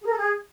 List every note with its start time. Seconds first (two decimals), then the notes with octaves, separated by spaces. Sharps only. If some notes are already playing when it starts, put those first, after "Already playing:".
0.01 G#4
0.06 A#4
0.12 A4
0.17 G#4